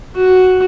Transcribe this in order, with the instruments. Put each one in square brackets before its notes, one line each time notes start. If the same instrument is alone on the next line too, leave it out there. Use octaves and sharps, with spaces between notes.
[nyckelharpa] F#4